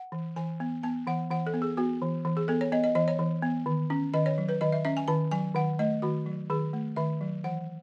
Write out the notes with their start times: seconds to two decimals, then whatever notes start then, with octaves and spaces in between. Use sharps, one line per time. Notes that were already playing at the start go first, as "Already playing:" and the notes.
Already playing: F#5
0.12 E3
0.36 E3 G#5
0.60 B3
0.83 B3 A5
1.07 E3 F#5
1.30 E3 F#5
1.47 A4
1.54 B3
1.62 G#4
1.77 B3 F#4
2.02 E3
2.25 E3
2.37 G#4
2.48 B3 A4
2.61 C#5
2.72 B3 D#5
2.84 D#5
2.95 E3 D#5
3.08 C#5
3.19 E3
3.42 B3
3.66 D#3
3.90 C#4
4.14 D#3 D#5
4.26 C#5
4.38 F#3
4.49 B4
4.61 D#3 D#5
4.72 E5
4.85 C#4 E5
4.97 G#5
5.08 D#3 A5
5.31 F#3 G#5
5.55 D#3 F#5
5.79 A3 D#5
6.02 D#3 F#4
6.26 F#3
6.50 D#3 G#4
6.73 A3
6.96 D#3 E5
7.21 F#3
7.44 E3 F#5